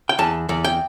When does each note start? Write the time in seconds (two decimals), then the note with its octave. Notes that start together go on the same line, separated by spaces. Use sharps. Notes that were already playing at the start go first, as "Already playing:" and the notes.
0.09 G5
0.19 E2 A5
0.49 E2
0.64 G5